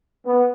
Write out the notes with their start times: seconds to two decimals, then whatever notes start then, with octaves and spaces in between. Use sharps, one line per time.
0.25 B3